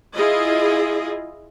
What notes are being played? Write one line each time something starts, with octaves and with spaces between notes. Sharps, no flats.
E4 F4 G#4 D#5